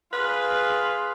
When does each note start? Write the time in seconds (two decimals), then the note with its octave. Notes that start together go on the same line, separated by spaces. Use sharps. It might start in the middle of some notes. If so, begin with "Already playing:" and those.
0.13 F4 G#4 B4 F5